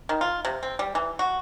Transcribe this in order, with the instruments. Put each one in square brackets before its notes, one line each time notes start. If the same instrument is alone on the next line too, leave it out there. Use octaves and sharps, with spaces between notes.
[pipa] D#3
F4
C3
C4
G3
E3
F#4